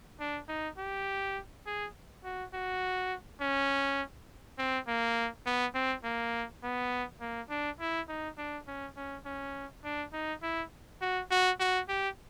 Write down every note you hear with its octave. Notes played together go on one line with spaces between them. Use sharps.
D4
D#4
G4
G#4
F#4
F#4
C#4
C4
A#3
B3
C4
A#3
B3
A#3
D4
E4
D#4
D4
C#4
C#4
C#4
D4
D#4
E4
F#4
F#4
F#4
G4